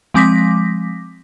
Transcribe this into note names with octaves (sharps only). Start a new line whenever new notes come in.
F3 G#3 C4 D6 A#6 B6